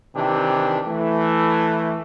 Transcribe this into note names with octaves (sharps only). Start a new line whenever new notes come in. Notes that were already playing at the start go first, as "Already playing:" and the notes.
C3 D#3 E3 D4 G4
E3 A3